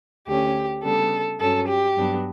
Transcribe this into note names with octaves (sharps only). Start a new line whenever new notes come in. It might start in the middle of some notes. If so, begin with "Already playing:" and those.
D2 D3 A3 C#4 G4
C#3 G3 B3 D4 A4
G2 F#3 C#4 A4
G4
G2 F#3 B3 D4